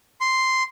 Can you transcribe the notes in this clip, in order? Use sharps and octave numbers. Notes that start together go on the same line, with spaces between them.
C6